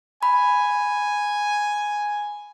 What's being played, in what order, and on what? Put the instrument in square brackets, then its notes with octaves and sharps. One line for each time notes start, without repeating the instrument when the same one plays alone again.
[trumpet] G#5 [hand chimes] B5